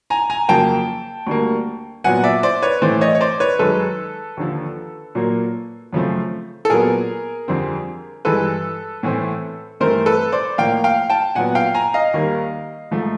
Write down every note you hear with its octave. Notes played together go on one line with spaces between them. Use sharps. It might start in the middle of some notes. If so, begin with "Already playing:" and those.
G#5 A#5
G#5 A#5
F2 C#3 F#3 A#3 G5 A5
D2 D3 G3 A#3
A#2 F#3 B3 F#5 G#5
D5 E5
C5 D5
B4 C#5
A2 E3 A3 C4 C5 D5
C#5 D#5
C#5
C5 D5
B4 C#5
F#2 D#3 G#3 A4 B4
D#2 D3 F3
A#2 F#3 A#3
F#2 C#3 F3 A3 C4
A4
A#2 F#3 B3 G#4 A#4
F2 D3 G3 C4
G2 E3 G#3 A4 B4
A2 E3 A3 C4
G2 E3 A3 C4 A#4 C5
A4 B4
C5 D5
A2 F3 A#3 F5 G5
F5 G5
G5 A5
A#2 F#3 B3 F#5 G#5
F5 G5
G#5 A#5
D#5 F5
D#2 D#3 G3 A#3
G#2 F3 A3